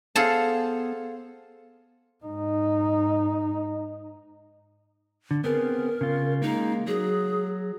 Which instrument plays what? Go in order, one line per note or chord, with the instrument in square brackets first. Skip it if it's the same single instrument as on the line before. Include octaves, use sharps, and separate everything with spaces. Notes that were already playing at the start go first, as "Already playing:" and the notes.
[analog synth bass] B3 [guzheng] G#4 A4 A5 [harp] C5 F5
[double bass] G#2 D#4
[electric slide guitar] D3
[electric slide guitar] B3 C4 G#4 [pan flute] A#4
[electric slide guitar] C#3 F4
[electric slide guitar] G#3 A#3 [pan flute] D#4
[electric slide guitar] F#3 [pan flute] G#4